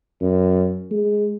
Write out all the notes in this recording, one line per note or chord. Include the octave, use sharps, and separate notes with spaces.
F#2
G#3